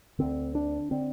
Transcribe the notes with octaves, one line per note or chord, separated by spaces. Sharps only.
D2 D3 C4
D4
D3 C4